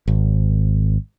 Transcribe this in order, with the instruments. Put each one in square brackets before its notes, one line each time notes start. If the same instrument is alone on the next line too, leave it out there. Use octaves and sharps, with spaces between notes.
[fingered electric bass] G#1